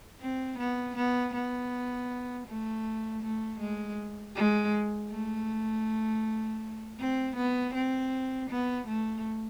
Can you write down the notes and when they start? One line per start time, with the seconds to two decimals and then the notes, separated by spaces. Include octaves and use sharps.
0.21 C4
0.58 B3
0.96 B3
1.34 B3
2.47 A3
3.22 A3
3.59 G#3
4.35 G#3
5.10 A3
6.99 C4
7.36 B3
7.74 C4
8.50 B3
8.87 A3